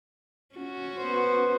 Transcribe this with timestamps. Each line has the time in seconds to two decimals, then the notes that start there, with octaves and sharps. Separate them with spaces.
0.56 C#4 F#4
0.98 B3 C5